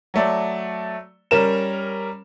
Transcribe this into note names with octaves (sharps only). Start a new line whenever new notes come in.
F#3 A3 D5
G3 C#4 A#4 E7